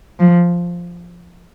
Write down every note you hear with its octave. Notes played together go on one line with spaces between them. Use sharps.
F3